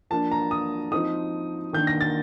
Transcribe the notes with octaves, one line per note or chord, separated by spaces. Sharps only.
F3 A#3 D4 A5
A#5
D#6
F3 C4 D#4 D#6
D#3 A#3 D4 G6
A#6
A6